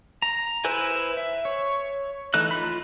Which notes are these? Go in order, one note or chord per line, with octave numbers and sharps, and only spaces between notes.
A#5
E4 B4 C5 G#5
E5
C#5
E3 A3 D#4 F#6
F4 B5